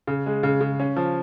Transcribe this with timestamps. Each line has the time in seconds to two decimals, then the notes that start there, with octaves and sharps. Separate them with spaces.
0.07 C#3
0.26 G#3
0.43 C#3
0.61 C#3
0.80 C#4
0.96 F3